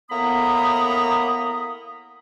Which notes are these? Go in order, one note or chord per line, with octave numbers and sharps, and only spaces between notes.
A2 A#3 B3 A#5 B5 D#6